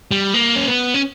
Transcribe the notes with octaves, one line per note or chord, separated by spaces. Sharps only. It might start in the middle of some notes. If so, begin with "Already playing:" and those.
G3
A#3
C#4
B3
C#4